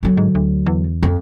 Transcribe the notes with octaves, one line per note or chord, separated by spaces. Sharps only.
D3 F#3
G#2
D2
E2
F2